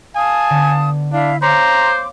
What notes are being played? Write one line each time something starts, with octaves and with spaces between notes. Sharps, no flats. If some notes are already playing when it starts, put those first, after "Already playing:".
F5 G#5 A5 D#6
D3 B3
D4 E4 F5
C5 C#5 F5 A#5 C6 D6